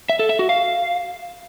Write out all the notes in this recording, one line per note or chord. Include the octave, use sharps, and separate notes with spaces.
E5
A4
E5
F#4
F5